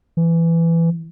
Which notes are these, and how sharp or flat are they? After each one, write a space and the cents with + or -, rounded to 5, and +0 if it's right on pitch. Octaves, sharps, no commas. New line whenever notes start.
E3 +15